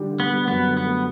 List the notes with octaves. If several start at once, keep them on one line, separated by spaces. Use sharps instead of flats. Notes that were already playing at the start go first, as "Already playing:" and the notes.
Already playing: D3 G3 D4 G4
D3
B3
G3
F#2 B3
D3
B3
A3